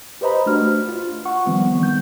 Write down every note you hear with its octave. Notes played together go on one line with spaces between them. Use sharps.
G4 B4 C5 D#5 A#5 B5
A3 D4 F#4 F6
F4
F#5 C#6
D#3 F3 G3 B3 C4
D#3 G6